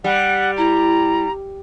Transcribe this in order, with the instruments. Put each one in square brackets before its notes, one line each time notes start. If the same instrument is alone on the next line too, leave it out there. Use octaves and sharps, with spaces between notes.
[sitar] G3 [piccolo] F#5
[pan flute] E4 [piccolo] A#5